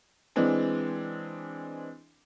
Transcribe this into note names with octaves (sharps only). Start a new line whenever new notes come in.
E3 G#3 C4 D4